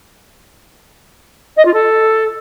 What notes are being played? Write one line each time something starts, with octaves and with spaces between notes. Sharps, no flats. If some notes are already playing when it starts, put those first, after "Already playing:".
D#5
F4
A4